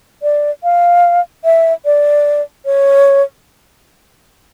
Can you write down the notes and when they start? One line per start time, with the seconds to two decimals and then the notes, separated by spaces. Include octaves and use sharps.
0.23 D5
0.64 F5
1.45 E5
1.85 D5
2.66 C#5